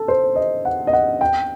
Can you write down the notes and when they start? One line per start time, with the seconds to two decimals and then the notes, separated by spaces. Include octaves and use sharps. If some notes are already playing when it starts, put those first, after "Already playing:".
Already playing: A4
0.08 C5
0.36 D#5
0.65 F#5
0.87 D#5
0.93 F#5
1.21 G5